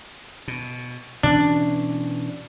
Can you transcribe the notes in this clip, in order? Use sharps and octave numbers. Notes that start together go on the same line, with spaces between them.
B2
B2 E3 C#4 D4